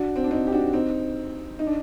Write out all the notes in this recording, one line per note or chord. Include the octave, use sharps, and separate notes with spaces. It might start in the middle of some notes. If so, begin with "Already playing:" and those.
Already playing: D4 F#4
C4
D4
C4 D#4
G4
D4 F#4
C4 D#4
D#4
D4